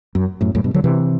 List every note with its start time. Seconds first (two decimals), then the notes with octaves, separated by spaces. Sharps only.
0.15 F#2
0.41 F#2 A2
0.55 F#2 A2
0.64 G2 B2
0.74 D3 F#3
0.84 C3 E3